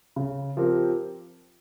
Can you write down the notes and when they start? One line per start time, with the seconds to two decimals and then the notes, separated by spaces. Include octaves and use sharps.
0.16 C#3
0.57 F3 C4 G4 A#4